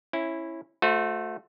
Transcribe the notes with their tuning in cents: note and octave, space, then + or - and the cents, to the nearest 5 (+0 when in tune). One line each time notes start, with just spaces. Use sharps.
C#4 -25 E4 +0
A3 +0 F#4 -35 C5 +0